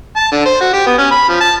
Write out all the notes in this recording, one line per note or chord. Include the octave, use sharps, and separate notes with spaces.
A5
D3
C5
F#4
G4
B3
C#4
B5
F3
A5